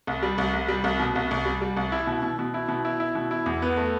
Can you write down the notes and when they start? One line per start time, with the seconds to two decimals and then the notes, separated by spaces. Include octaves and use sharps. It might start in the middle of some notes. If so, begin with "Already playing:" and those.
0.07 C2
0.23 G3
0.38 C2
0.53 C2
0.68 G3
0.84 C2
1.00 B2
1.15 C2
1.31 C2
1.45 G3
1.61 G3
1.77 C2
1.92 E4
2.07 B2
2.23 B2
2.39 B2
2.54 E4
2.69 B2
2.85 E4
3.00 E4
3.15 B2
3.31 E4
3.46 E2
3.62 B3
3.77 A3